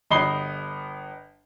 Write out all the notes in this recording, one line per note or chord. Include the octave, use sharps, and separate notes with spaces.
G1 D#5 B5 C7 G7